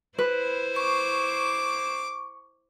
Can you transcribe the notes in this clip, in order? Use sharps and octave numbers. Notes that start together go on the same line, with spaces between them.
E4 B4 C5
C#6 D6